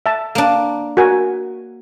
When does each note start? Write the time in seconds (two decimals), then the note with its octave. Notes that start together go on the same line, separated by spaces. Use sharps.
0.06 E5 A5
0.35 A#3 D4
0.97 F#4 A#4 G#5